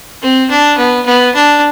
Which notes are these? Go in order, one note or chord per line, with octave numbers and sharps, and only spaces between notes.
C4
D4
B3
B3
D4